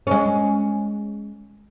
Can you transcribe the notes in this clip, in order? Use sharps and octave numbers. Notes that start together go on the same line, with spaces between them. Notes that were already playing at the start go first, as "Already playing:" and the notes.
G#3 C#4